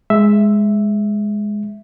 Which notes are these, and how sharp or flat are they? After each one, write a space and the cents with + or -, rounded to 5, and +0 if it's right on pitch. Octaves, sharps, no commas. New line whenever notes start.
G#3 +0 E5 +0